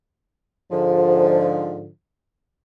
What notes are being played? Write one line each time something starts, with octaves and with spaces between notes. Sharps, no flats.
G#2 D3 F3